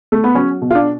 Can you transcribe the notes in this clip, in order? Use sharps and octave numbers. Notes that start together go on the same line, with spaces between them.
A3
B3
F#3 C#4
B2
F4
D4